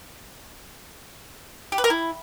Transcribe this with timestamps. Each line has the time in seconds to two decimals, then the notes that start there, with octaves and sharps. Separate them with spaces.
1.72 G4
1.78 B4
1.84 A#4
1.90 E4